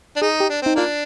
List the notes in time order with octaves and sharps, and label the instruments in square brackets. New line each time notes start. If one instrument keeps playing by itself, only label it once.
[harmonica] D4
[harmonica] D#4 [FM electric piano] G#4
[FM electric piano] G4
[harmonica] D4
[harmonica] C4 [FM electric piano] D#4
[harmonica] A#3 D4 [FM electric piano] F4